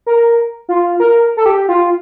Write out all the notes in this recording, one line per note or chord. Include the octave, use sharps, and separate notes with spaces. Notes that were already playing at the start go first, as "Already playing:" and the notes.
A#4
F4
A#4
A4
G4
F4